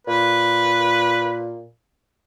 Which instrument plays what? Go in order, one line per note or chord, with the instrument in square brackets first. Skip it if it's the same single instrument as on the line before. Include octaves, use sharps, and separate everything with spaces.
[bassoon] A#2 [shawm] B4